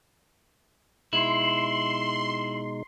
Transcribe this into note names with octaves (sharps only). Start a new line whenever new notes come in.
B2 G#3 D#4 E4 C6